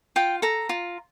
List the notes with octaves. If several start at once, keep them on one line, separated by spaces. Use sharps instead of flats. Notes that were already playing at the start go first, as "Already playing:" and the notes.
F4 G5
A4 A#5
F4